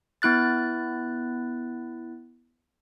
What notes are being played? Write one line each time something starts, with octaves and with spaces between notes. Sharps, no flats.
B3 E4 F#6 A6